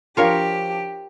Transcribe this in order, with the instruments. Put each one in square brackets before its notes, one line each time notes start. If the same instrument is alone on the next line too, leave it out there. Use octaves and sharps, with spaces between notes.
[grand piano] F3 D4 [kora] F4 A#4 C#5 [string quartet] G4 [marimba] F5